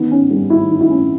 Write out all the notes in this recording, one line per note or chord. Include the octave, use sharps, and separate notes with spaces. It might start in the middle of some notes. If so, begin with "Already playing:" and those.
Already playing: D#3 B3
C#4
G3
D#3 E4
D#3
E4
C#4